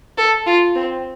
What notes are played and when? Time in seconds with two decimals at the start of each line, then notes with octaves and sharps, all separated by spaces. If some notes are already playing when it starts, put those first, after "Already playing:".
0.18 A4
0.47 F4
0.75 C4